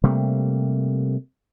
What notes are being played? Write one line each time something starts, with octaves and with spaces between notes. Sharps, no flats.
C3 G3 A3 A#3